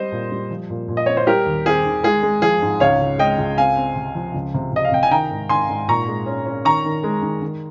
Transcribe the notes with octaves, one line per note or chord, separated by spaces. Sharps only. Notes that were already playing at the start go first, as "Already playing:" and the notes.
Already playing: G3 C4 C5 D#5
A#2
G3
F3
A#2
A#2
D#5
C4 C#5
C5
G3 G4 A#4
D#2
C4 G#4
D#3
G#3 G#4
G#3
F3 G#4
G#2
C#2 C#5 F5
C#3
G#3 D#5 G5
C#2
C4 F5 G#5
C4
C3
F3
C#2
C3
C3 D#5
F5
C3 G5
G#5
D#3 G5 A#5
G#2
D#3 G#5 C6
G#2
A#2 A#5 C#6
G#3
C#4
C#4
D#3 A#5 C#6
D#3
G#3
D#3
D#3